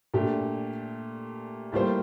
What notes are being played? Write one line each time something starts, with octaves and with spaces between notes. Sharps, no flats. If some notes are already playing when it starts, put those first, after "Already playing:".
A#2 A3 D4 G4
A2 G3 A#3 F4 C5